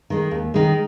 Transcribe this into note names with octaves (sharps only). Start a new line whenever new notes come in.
D#3 G#3
D#2
D#3 G#3